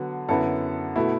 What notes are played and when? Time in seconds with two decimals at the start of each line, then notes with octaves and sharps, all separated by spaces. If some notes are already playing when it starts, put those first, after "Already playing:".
Already playing: D3 F#3 B3
0.29 F#2 D3 B3 E4 A4
0.96 B2 A3 E4